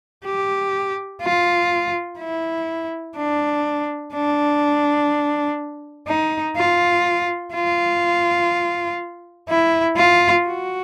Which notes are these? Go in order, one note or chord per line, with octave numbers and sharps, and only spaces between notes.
G4
F4
E4
D4
D4
D#4
F4
F4
E4
F4
F#4